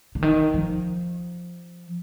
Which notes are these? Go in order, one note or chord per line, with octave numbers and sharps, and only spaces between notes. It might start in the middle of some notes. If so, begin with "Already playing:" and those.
D3
D#3
F3